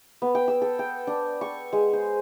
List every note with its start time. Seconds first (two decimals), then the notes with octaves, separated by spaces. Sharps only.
0.22 B3
0.35 G5
0.48 E6
0.62 A4
0.79 G5
1.07 D4
1.41 C#6
1.73 G#3
1.93 C5